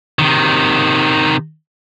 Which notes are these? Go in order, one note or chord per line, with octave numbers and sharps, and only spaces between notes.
C3 D#3